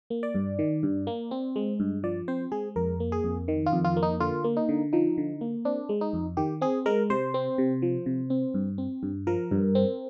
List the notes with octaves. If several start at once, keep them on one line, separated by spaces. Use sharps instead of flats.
A#3
D5
G2
D#3
G2
A#3
C4
G#3
G2
F3 D5
C4 C5
G#3 G#4
F2 A#4
A#3
G#4
F2
D#3
F4
F2
F4
A#3
D#4
D3 F4
A#3
D#4
D3
F3 D#4
D3
A#3
C4 D4
G#3
D#4
F2
D#3 G4
C4 G#4
G#3 A#4
C3 C5
C4
C3
F3
C3
C4
G2
C4
G2
F3 A#4
G2
C4